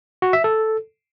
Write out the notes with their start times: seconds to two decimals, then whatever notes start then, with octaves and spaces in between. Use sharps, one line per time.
0.22 F#4
0.33 E5
0.44 A4